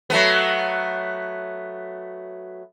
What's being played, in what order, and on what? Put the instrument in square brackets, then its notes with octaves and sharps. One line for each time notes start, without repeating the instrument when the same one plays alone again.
[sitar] F#3 A3 B3